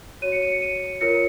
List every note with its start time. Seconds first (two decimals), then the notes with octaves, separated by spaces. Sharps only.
0.22 F#4 C#5 D#7
0.32 C#7
0.42 D#7
0.52 C#7
0.62 D#7
1.01 F4 A#4 C#5 C#7